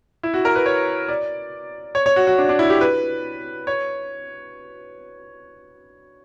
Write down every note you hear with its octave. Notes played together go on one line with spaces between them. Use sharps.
E4
F#4
A#4
B4
C#5
D5
C#5
C#5
F#4
F#4
D4
D4
E4
G4
B4
C#5